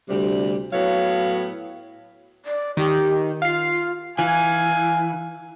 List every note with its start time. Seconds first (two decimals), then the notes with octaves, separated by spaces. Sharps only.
0.08 D2 C3 G3
0.73 A2 F#3 B3 C#5 F5
2.46 D5
2.77 D#3 G4
3.42 F4 F5 C7
4.19 E3 F5 G#5